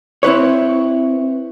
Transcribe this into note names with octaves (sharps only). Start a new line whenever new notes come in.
C4 E4 B4 C#5